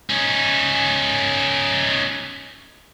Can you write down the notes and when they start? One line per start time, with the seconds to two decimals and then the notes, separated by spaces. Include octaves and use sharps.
0.10 C#4 D#4